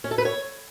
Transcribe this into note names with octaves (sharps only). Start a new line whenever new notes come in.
C#4
A4
B4
C#5